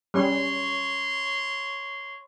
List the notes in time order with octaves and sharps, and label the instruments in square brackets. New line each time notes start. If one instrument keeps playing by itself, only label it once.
[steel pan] G3 C#4 [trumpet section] C#5 C6